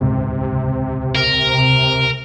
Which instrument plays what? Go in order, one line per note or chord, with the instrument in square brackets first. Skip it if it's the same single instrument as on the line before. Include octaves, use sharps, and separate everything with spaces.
[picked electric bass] D#1 C#2 G#2 [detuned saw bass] C3
[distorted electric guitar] A#4